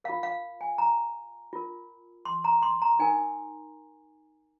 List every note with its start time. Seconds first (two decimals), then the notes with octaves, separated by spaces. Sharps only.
0.04 A#4 F5
0.09 F4
0.23 F5
0.61 G#5
0.78 A#5
1.53 F4 A#4
2.25 C6
2.44 A#5
2.63 C6
2.82 A#5
2.99 D#4 A#4 G#5